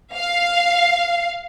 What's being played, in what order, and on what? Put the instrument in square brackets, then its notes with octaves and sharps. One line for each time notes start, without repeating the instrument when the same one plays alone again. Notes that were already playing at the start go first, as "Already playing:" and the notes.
[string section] F5